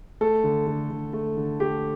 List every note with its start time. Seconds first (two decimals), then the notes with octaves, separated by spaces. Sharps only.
0.21 A3 A4
0.44 D3
0.67 D3
0.90 D3
1.13 A3
1.37 D3
1.60 A3 G4